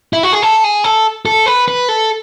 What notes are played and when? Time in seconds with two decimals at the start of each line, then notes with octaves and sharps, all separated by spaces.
0.13 E4
0.23 F#4
0.33 G#4
0.42 A4
0.64 G#4
0.84 A4
1.26 A4
1.46 B4
1.68 B4
1.89 A4